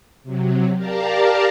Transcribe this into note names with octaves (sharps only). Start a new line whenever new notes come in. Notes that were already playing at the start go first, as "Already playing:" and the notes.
C3 F#3
G4 A#4 D5 F5 A5 A#5